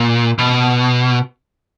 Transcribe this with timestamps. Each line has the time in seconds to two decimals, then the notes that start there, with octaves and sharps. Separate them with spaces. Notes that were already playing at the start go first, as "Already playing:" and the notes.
Already playing: A#2
0.39 B2